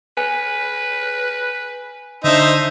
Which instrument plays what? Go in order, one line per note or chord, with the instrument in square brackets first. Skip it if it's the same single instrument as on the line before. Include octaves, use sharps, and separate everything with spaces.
[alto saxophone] B4 [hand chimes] G#5
[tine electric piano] D3 D4 [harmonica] D#4 C5 E5